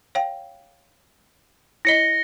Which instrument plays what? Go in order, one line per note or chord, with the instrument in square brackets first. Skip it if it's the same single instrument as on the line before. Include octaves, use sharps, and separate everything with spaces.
[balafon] C#5 F5 G5
[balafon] E4 C#5 D#5 [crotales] A#6 C#7 G7